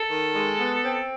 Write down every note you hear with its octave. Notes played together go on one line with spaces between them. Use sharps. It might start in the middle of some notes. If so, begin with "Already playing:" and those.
Already playing: A4
D#3
G#3
B3
C4